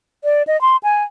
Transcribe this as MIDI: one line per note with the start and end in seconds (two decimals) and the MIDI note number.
0.24 0.43 74
0.47 0.60 75
0.61 0.77 84
0.83 1.03 80